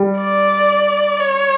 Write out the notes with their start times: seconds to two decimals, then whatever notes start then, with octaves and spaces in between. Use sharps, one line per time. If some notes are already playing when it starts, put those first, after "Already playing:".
Already playing: G3
0.18 D5
1.20 C#5